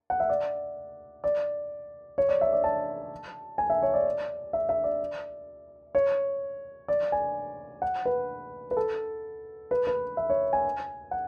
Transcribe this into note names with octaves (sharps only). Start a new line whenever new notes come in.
F#5
E5
D5
D5
C#5
D5
E5
D5
A5
G#5
E5
C#5
D5
E5
E5
D5
C#5
D5
G#5
F#5
B4
B4
A4
B4
B4
E5
C#5
G#5
F#5